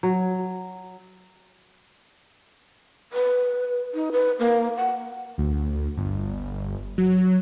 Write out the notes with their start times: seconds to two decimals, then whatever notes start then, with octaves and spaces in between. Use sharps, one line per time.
0.03 F#3
3.13 B4
3.94 D#4
4.12 B4
4.39 A#3
4.77 F#5
5.38 D2
5.97 G1
6.98 F#3